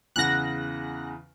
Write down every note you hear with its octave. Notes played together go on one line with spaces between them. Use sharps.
E2 C#3 F#5 F#6 A#6